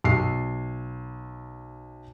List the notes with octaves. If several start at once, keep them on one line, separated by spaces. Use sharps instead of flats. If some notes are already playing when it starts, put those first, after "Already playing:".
B1 C7